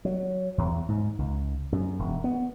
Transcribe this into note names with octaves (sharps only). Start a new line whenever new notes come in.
F#3
E2
G#2
C#2
F#2
E1
B3